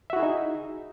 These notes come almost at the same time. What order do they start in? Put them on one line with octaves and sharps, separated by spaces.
E5 F#4 E4 G#4 D#4